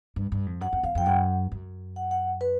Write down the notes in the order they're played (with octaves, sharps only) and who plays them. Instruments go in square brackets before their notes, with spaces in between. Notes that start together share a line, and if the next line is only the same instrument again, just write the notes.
[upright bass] G2
G2
F2
[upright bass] F#2 [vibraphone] F#5
[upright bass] F2
[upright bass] E2 [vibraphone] F5
[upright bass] F2 [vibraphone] G5
[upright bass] F#2 [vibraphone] F#5
[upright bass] F#2
[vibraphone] F#5
F#5
B4